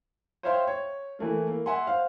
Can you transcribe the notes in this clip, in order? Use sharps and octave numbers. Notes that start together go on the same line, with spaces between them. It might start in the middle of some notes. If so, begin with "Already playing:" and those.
C5 C#5 E5 F5 G5 C6
C#5
E3 A3 A#3
A#3
E5 F#5 G#5 C6
C5 F5